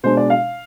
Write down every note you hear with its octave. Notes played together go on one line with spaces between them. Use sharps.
B2 G#3 D4 C5
D5
F5